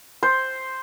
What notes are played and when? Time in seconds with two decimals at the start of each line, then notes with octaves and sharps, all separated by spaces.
0.23 C5